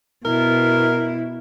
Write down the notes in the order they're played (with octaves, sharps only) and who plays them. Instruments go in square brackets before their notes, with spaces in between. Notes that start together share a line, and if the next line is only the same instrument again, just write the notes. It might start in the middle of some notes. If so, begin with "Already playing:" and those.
[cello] B2 E4 [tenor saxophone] A#4